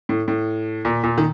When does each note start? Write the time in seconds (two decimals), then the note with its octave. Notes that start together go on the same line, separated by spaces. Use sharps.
0.09 A2
0.28 A2
0.85 A#2
1.04 A#2
1.18 D#3